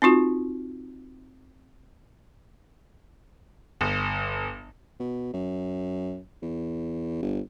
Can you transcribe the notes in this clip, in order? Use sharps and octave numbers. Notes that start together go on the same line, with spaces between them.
C4 D#4 F4 F#4
G1
B2
F#2
E2
G1